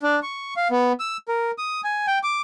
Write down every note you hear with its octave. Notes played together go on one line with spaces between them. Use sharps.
D4
C#6
F5
B3
E6
A#4
D#6
G#5
G5
D6